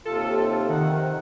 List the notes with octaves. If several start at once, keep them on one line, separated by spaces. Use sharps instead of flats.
D#2 C3 F4 A4
F2 C3 D#3 F#5